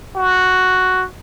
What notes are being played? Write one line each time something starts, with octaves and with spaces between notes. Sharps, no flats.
F#4